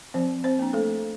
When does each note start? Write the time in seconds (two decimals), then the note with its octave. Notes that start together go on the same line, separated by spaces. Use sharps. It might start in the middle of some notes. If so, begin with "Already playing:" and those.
0.14 F3 C4 C5
0.44 C4 C5
0.59 A#3 D4
0.73 A3 A4